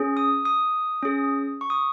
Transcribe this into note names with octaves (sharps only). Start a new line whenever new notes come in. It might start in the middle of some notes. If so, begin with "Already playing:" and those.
Already playing: C#4 G#4
D#6
D#6
C#4 G#4
C#6
D#6